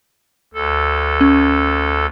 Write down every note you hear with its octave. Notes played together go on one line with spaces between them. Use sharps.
D2 A4
C#4